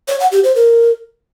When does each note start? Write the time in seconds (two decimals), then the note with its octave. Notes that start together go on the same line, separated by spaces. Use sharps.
0.08 C#5
0.20 F#5
0.32 G4
0.44 C5
0.55 A#4